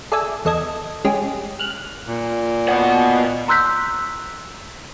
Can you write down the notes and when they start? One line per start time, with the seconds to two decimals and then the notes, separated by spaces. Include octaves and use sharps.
0.12 G#4 A4 D5 E5 G#5
0.45 E2 A4 D#5 G#6
1.05 G#3 C#4 G4 G#4
1.59 F6 F#6
2.07 A#2
2.69 B2 F#5
3.48 A#5 C6 E6 F#6 G6 B6